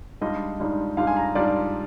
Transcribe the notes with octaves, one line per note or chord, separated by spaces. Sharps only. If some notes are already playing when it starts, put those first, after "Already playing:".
G#2 G3 D4 F4 D#5
G#2 G3 D4 F4
G#2 G3 D4 F4 F5
G#5
A#5
G#2 G3 D4 F4 D5